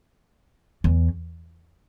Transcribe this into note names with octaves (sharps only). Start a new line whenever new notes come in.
E2